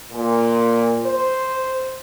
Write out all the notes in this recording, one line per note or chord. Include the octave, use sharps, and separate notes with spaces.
A#2
C5